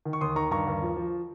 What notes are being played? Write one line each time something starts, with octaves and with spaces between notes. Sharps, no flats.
D#3
C#6
D#2 C6 D#6
D#3 A#5 C#6
G2 A#5 C#6
D#2
F3
F3